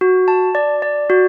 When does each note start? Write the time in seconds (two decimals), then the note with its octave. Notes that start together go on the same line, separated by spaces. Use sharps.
0.01 F#4
0.28 A5
0.55 D5
0.82 D5
1.10 F#4